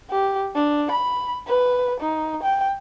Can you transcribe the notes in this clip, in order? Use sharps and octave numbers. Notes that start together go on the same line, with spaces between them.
G4
D4
B5
B4
D#4
G5